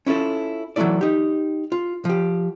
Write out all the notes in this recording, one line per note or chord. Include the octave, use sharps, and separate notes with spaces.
C#4 E4 F4 A4
E3 F#3 G#3 A3 E4 D5
D#4 G4
F4
F3 G4